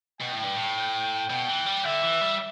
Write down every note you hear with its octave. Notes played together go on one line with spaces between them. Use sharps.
B2 G5
A2
G2
A2
B2 G5
E3
G3
D3 E5
E3
G3